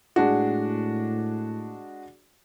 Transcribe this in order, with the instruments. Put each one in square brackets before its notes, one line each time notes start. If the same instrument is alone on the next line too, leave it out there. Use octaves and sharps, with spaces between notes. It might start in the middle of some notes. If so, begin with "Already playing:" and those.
[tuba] A2 [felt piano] G#3 D4 F#4